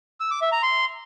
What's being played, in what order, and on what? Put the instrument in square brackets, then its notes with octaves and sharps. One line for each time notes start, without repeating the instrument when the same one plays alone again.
[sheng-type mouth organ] E6
D6
E5
A#5
C6